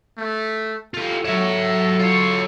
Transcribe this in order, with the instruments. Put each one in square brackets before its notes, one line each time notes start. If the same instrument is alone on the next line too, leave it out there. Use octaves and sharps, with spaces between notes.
[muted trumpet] A3
[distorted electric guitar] F4 G4 [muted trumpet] A4
[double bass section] F#3 [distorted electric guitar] C#5 E5
[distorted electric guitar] F4 C#5